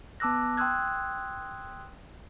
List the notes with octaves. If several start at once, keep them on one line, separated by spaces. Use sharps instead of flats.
B3 A5 D6 E6 F#6 A#6
G5 C6 D#6 E6 F#6 G#6